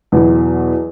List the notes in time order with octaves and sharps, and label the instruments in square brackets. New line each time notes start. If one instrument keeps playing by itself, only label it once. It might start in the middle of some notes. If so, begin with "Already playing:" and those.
[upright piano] E2 B2 F#3